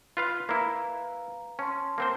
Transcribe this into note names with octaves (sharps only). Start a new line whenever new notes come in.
F4 B4 F5 F#6
A#3 E4 B4 F5 A#5
C#4 A5 C6
A#3 C4 C5